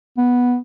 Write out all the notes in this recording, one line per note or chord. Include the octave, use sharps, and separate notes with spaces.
B3